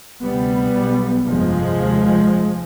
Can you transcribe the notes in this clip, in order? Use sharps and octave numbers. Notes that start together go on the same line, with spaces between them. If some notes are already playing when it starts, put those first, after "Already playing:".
D2 C3 G3 B3
B1 B2
G1 F2 C3 F3 G#3
F1 D#2